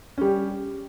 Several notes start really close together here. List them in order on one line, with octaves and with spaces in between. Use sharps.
C#4 G3 G4